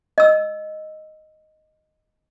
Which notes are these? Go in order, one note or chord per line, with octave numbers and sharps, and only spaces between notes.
D#5 E6